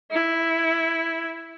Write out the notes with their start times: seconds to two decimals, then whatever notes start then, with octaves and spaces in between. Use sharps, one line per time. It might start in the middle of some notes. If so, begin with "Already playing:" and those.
0.12 E4